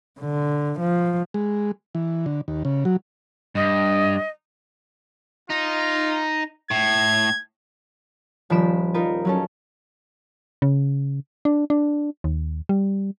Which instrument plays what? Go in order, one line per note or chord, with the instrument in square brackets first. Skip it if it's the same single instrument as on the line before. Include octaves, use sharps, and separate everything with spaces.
[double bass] D3
F3
[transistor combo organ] G#3
E3
D3
D#2
C#3
F#3
[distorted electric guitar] G2 [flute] D#5
[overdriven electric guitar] D#4 [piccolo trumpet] F4
[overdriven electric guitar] A2 [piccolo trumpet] G#6
[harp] D#1 F3 D4 B5 D7 E7
D#4 F4 A#4 B4
F#3 C#4 A4
[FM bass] C#3
D4
D4
D#2
G3